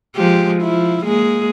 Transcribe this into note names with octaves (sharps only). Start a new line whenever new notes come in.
F3 G#3 G4
F3 E4
G#3 A#3 G#4